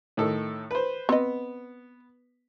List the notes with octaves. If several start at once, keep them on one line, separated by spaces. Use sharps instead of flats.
A2 D#3 A4
B4 C5
B3 C4 D#5